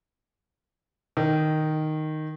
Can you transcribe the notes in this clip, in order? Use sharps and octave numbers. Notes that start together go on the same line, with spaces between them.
D#3